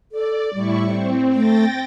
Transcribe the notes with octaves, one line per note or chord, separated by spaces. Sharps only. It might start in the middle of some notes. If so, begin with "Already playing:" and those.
A4 D5
A2 G3 E4 C#6
C4
A3 G5 A6 A#6